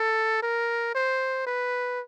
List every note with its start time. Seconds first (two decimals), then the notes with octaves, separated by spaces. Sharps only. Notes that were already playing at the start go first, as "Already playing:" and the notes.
Already playing: A4
0.43 A#4
0.95 C5
1.47 B4